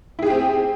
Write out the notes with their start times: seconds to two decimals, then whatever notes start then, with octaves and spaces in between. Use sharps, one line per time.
0.19 E4
0.23 G#4
0.26 G4
0.30 C4